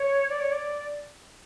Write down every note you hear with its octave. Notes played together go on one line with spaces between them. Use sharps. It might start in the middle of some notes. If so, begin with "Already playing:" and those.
Already playing: C#5
D5
C#5
D5